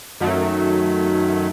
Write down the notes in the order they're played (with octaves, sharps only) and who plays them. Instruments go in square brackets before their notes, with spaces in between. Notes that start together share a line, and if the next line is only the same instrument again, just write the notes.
[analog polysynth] F#2 D#3 F#3 A3